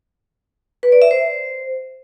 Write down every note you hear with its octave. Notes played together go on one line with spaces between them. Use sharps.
B4
D5
E5
C5